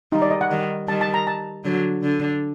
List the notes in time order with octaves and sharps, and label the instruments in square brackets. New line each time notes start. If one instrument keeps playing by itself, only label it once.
[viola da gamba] D#3 G3 [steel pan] D#4
[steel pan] D5
D#5
F#5
[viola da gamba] D#3 G3
[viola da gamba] D#3 G3 [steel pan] A5
[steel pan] A5
A#5
A5
[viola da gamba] D3 F#3
D3